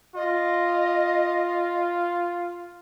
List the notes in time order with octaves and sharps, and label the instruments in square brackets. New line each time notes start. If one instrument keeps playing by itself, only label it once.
[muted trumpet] F4 [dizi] D#5